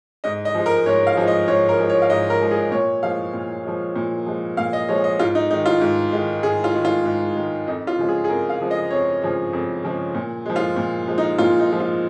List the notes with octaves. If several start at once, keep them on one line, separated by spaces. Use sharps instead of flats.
G#2 D#5
D#5
F3 G#3
A#4
G#2 C#5
F5
F3 G#3
D#5
G#2 C#5
A#4
F3 G#3
C#5
F5
G#2 D#5
A#4
F3 G#3
G#4
A#2 C#5
F3 G#3 F5
A#2
F3 G#3
A#2
F3 G#3
A#2 F5
D#5
F3 G#3 C#5
D#5
G#2 F4
D#4
D#3 G#3 D#4
F4
G#2
D#3 G#3
G#2 G#4
F4
D#3 G#3
F4
G#2
D#3 G#3
F2 D#4
F4
C#3 F3 G#3
G#4
G#4
F2 A#4
F5
C#3 F3 G#3
D#5
F2 C#5
C#3 F3 G#3
F2
C#3 F3 G#3
A#2
F3 G#3
F4
A#2
F3 G#3
D#4
A#2 F4
D#4
F3 G#3
F4